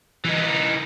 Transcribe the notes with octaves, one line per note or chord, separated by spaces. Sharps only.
E3 D#4